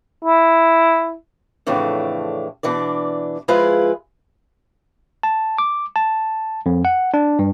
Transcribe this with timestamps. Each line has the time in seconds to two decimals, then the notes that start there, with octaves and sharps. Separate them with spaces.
0.25 E4
1.67 F2 A2 C#3 E3 D4
2.63 B2 E3 D4 D5
3.48 F3 G#3 E4 F4 G#4 B4
5.23 A5
5.58 D6
5.96 A5
6.66 F2
6.85 F#5
7.14 D4
7.39 G2